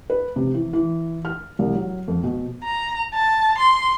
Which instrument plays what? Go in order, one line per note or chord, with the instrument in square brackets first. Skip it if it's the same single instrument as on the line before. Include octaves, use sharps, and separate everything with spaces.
[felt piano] B4
C3
E3
E3
F6
C2
F#3
F2
B2
[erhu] A#5
A5
C6